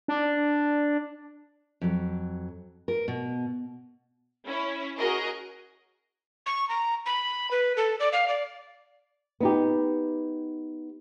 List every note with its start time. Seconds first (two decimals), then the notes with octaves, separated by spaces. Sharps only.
0.08 D4
1.81 F2 F#3
2.88 A#4
3.08 B2
4.45 C#4 E4 C#5
4.98 F#4 G#4 A#4 D#5
6.46 C#6
6.69 A#5
7.06 B5
7.51 B4
7.77 A4
8.00 D5
8.13 F5
8.28 D5
9.40 B3 D#4 G4